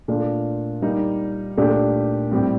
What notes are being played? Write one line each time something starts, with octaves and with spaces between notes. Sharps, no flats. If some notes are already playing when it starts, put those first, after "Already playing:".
A#2 A3 D4 F4
G3 A#3 D#4
A#2 A3 D4 G4
A2 G3 C4 G4